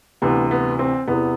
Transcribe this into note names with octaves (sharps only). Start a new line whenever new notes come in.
D2 C3 E3 B3
B3
C4
E2 C3 E3 B3